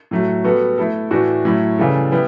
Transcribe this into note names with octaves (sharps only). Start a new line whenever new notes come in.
A2 F#3 A3
G3 B3 F#4 A4
A3 E4 A4
A2 E3 A3 D4 F#4
A2 F#3 A3 E4
C#3 E3 G3 D4 A4
G3 B3 E4